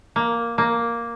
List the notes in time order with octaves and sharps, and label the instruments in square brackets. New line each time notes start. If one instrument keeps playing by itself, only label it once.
[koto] A#3
A#3